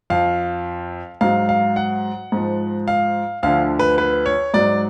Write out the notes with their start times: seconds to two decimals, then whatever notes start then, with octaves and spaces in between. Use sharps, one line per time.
0.10 F2 F3 F5
1.21 G#2 F#3 F5
1.49 F5
1.76 F#5
2.32 G#2 F3
2.88 F5
3.43 D2 D3 F3 F5
3.79 B4
3.98 B4
4.26 C#5
4.54 G#2 F#3 D5